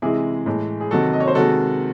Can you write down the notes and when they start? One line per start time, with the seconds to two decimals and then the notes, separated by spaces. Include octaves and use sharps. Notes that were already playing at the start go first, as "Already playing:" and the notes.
0.02 C3 E3 G#3 E4 G#4
0.46 A2 E3 G#3
0.81 G#4
0.91 C3 D#3 F#3 F#4 A4
1.13 D#5
1.20 C#5
1.27 C5
1.35 C3 D#3 G#3 F#4 A4